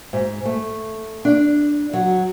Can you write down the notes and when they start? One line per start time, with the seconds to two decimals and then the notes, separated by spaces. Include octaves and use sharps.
0.13 G#2
0.45 A3
1.25 D4
1.93 F#3